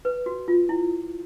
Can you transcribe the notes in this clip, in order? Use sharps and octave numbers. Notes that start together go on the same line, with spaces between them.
B4
F#4
F4
E4